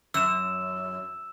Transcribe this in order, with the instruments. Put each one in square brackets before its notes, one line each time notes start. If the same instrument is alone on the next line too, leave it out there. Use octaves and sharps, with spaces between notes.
[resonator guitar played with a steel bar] F#2 [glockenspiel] E6 E7